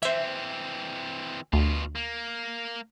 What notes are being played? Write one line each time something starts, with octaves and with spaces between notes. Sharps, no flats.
E3 C4 C5 E5
D2 B2 F4
A#3